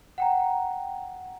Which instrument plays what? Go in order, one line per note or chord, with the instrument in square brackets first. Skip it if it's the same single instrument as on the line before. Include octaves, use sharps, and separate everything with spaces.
[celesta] F#5 G5 A#5